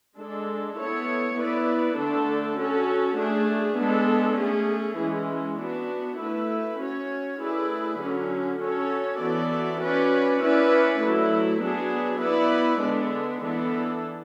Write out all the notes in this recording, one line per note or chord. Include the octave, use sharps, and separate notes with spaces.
G#3 D4 A4
B3 E4 A4 C#5
B3 E4 B4 D5
D3 A3 D4 A4
C#4 F#4 A4
A3 D4 G#4
G#3 B3 D4 A4
A3 C#4 G#4
E3 G#3 C#4
B3 D4 F#4
A3 E4 B4
C#4 F#4 C#5
A3 E4 G#4 B4 D5
D3 F#3 C#4
C#4 F#4 A4 C#5
E3 B3 F#4 A4 D5
C#4 F#4 B4 D5
C#4 E4 B4 D5
F#3 A3 E4
F#3 B3 D4 G#4
B3 E4 B4 D5
D3 G#3 B3 D4
E3 B3 D4 A4